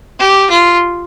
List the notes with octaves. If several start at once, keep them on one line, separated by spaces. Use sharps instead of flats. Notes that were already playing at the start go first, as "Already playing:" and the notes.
G4
F4